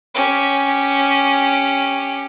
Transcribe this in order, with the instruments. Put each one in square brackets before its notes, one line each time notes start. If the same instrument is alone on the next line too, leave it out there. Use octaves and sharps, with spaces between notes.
[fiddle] C#4 G4